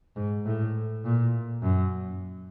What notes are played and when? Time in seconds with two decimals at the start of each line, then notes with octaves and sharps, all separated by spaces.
0.16 G#2
0.46 A2
1.05 A#2
1.63 F#2